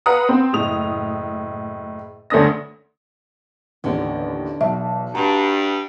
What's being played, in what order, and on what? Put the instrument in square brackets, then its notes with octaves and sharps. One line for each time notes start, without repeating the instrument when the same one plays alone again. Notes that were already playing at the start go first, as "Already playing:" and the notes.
[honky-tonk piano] B4 F5 F#5 A#5 D#6
C4
F#1 A2 D#6 F7
D2 A3 C#4 D4 D#6 A#6
[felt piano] A1 D#2 [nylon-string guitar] D3 B3 C#4
[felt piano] B1 [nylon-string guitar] E2 [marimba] E5
[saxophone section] G2 [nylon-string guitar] F#4 [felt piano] A#5